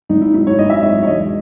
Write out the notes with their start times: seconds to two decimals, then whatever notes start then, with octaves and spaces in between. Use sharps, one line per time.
0.09 G#1 D#4
0.22 E4
0.34 G#2 F#3 E4
0.47 C#5
0.58 G#1 D#5
0.70 E5
0.82 G#2 F#3 D#5
1.03 C#5
1.07 E1 D#5